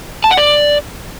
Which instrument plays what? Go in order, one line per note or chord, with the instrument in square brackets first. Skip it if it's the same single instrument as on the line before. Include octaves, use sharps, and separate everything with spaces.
[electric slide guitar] A5
F#5
D5